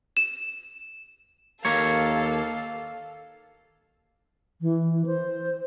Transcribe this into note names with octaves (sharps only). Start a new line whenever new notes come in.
E7
D#2 A#3 A4 C#5 F5
E3
C5